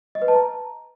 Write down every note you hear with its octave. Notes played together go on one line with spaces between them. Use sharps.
D#5
B4
A5
A#5